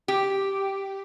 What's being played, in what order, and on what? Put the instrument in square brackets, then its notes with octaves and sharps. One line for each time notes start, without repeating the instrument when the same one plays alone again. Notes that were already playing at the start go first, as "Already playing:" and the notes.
[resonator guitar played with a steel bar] G4